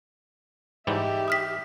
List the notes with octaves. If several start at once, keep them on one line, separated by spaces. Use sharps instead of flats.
G#2 E3 G3 G4 E5
D#6 F6 B6